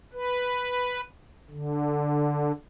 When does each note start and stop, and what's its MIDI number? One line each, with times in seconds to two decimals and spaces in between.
0.13 1.01 71
1.50 2.52 50